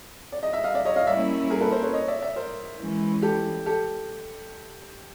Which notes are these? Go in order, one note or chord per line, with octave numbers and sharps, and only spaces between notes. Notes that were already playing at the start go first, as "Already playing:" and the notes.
D5
D#5
E5
D#5 F5
D5 E5
C#5 D#5
D#5 F5
G3 A#3 C#4 E4 D5 E5
G#4 A#4
A4 B4
A#4 C5
B4 C#5
C#5 D#5
D5 E5
D5 E5
A#4 C5
E3 G#3 C#4
G4 A4
G4 A4